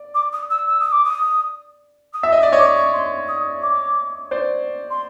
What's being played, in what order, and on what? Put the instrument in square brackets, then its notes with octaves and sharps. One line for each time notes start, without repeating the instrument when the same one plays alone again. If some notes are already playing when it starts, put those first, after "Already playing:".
Already playing: [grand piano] D5
[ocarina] D6
D#6
E6
E6
D#6
D6
D#6
D#6
[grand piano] E5 [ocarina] E6
[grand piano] D#5
[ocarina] D#6
[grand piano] D5
C#5 D#5
[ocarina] D6
C#6
C6
D#6
D6
[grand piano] C5 D5
[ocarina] C6